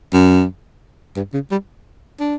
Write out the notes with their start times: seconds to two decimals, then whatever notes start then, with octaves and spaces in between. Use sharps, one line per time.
0.13 F#2
1.16 G2
1.34 C#3
1.51 G3
2.20 D4